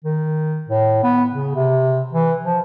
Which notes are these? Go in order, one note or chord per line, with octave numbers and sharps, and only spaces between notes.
D#3
A2
B3
C#3
C3
E3
F3